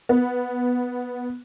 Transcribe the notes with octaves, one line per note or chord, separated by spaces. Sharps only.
B3